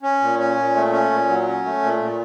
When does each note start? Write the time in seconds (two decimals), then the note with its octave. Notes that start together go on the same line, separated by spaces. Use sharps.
0.03 C#4
0.21 A#2
0.39 C#4
0.58 A#2
0.74 A3
0.92 C#4
1.11 A#2
1.28 F#3
1.47 C#4
1.65 A3
1.82 A#2
2.01 A#2